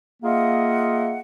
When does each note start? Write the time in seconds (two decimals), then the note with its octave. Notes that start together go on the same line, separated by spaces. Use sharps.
0.23 A#3 F4 G#4 D#5 E5 F#5